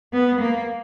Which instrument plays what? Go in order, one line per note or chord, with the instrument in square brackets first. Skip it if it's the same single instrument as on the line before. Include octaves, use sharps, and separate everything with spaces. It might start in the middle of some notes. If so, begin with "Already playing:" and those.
[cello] B3
A#3